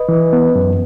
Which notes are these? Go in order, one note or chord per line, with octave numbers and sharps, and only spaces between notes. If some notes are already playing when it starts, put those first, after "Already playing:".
Already playing: B4 D#5
E3
B3
F#2